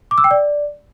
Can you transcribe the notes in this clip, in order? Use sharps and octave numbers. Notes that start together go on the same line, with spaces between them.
D6
E6
G5
D5